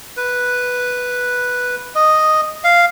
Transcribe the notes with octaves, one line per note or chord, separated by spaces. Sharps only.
B4
D#5
F5